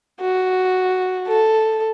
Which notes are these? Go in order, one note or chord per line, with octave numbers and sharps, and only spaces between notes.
F#4
A4